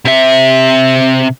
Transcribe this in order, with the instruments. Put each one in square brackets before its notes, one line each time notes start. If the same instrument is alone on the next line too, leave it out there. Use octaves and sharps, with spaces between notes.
[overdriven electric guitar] C3 E5